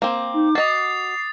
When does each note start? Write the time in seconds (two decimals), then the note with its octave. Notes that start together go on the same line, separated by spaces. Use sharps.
0.02 A#3 C4 D6
0.34 D#4
0.55 F#4 D#5 D#6 A6 C7